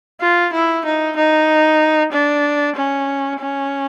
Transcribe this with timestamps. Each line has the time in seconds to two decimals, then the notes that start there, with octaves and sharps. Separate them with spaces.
0.21 F4
0.53 E4
0.85 D#4
1.16 D#4
2.12 D4
2.76 C#4
3.40 C#4